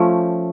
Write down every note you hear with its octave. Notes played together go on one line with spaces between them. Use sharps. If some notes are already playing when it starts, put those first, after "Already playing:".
Already playing: F3 A3 C#4